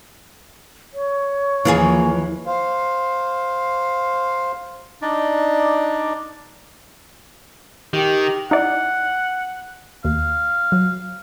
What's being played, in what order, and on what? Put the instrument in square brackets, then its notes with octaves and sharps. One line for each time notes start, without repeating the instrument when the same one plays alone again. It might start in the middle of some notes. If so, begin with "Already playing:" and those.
[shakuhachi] C#5
[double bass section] D#2 F3 [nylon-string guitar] E3 [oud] A#3 F4 G#4
[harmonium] C5 F5
[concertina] D4 D#4 D5
[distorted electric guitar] D#3 [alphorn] G4
[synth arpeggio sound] D#4 E4 D5 [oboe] F#5
[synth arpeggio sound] D#2 [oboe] F5
[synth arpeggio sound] F#3